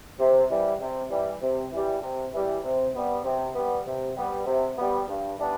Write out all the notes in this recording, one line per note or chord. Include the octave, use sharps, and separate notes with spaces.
C3
E3 G3
C3
E3 G3
C3
E3 G3
C3
E3 G3
C3
G3 B3
C3
G3 B3
C3
G3 B3
C3
G3 B3
G2
E3 G3 B3 D4